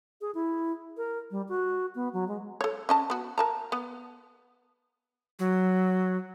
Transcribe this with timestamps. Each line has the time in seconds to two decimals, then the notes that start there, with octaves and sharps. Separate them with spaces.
0.21 G#4
0.35 E4
0.97 A#4
1.31 G3
1.49 F#4
1.95 B3
2.13 F#3
2.28 G#3
2.61 A4 C#5
2.89 C#4 D#5 A5
3.10 B3 F#4
3.38 A#4 A5 A#5
3.72 B3
5.39 F#3